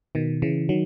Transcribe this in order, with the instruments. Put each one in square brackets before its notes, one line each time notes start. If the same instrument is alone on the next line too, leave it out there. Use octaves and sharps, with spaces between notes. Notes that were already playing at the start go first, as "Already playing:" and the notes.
[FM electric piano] B2 D#3
C#3 E3
D#3 F#3